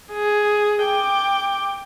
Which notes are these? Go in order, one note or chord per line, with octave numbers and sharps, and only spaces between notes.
G#4
G5 D6